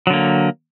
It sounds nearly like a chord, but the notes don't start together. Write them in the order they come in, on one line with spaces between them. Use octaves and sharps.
F#3 D3 A#3